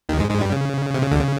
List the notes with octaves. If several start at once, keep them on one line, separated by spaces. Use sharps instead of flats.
D#2 D#3
G#2 G#3
G#2 G#3
G2 G3
C#3
C3
C#3
D2 D3
C#3